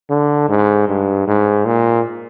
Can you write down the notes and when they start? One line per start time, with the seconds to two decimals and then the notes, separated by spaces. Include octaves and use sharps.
0.10 D3
0.49 G#2
0.88 G2
1.27 G#2
1.65 A#2